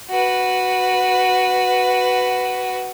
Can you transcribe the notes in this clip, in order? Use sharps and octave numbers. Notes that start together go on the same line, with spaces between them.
F#4 B4